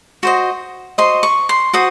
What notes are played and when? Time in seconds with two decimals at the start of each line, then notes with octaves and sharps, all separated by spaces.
0.23 F#4 C5 D#5
0.98 F#4 C5 D#5 C6
1.23 C#6
1.49 C6
1.73 F#4 C5 D#6